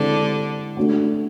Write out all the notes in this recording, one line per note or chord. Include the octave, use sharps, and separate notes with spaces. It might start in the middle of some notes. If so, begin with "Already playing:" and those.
Already playing: D3 G#3 C4 E4 G4
A3 D4 F#4